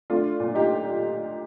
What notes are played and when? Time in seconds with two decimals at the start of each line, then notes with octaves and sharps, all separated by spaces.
0.10 A3 D4 F4
0.40 A#2
0.55 D#4 G4